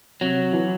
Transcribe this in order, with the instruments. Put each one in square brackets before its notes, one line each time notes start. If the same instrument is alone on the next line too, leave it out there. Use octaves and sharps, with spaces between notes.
[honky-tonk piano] C3 [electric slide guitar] F#3
[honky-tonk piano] E3